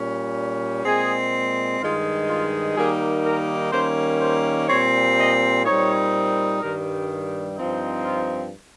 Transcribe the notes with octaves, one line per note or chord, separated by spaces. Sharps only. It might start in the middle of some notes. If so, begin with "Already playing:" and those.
Already playing: A#2 G3 C#4
A#2 G#3 C4 G#4
G2 D#3 G#3 F4
F4
D#3 G3 A#3 D#4 G#4
A#4
D#3 G3 A#3 C#4 C5
C5
A#2 G3 C4 C#5
D#5
A#2 G3 C4 D#4 C#5
G2 D#3 G3 A#4
G2 F3 C4 D#4
F4